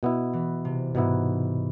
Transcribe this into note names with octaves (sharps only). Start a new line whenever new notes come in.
B2 B3 E4
E3
C3
G#2 B2 B3 E4